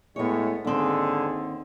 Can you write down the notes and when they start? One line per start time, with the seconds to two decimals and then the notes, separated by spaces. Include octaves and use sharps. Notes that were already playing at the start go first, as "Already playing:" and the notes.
0.16 A2 G#3 B3 C#5
0.65 D#2 G#2 D3 C4 G#4